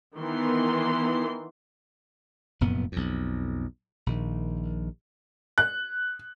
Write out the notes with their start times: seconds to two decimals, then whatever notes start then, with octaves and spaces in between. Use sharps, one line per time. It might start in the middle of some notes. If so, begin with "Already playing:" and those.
0.15 D#3 E3 B3 C6
2.61 F1 F#2 A#2 B3
2.92 B1 F2
4.06 A#1 D#3
5.58 F#6